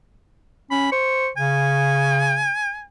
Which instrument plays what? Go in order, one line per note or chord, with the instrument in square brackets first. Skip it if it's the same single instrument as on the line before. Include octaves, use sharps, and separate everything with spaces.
[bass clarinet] C#4 [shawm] B5
[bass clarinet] C5 [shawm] C#6
[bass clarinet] C#3 [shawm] G#5